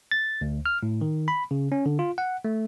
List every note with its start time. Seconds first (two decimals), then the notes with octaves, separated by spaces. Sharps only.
0.11 A6
0.41 D2
0.66 F6
0.83 A2
1.01 D#3
1.28 B5
1.51 C#3
1.72 C#4
1.86 D3
1.99 F4
2.18 F#5
2.45 A3